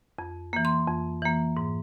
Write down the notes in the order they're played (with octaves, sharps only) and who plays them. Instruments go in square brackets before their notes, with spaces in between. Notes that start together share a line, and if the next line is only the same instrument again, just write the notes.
[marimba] F2
E3 A#3
C6
F2
E3 A#3
G#2